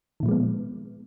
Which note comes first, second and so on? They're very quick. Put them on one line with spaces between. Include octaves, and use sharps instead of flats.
D#3 A#2 F3 G#3 B3